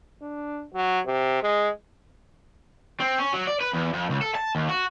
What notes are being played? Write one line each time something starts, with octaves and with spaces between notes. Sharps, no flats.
D4
F#3
C3
G#3
C4
C#4
F#3
D5
B4
E2
F2
C#2
A4
A5
D#2
F#4